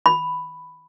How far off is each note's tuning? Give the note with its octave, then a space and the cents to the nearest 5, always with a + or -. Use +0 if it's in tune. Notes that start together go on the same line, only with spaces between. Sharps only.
B5 +5